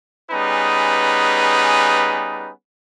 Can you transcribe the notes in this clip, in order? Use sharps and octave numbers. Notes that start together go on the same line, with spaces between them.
G3 B3 C#4 D#4 G#4 B4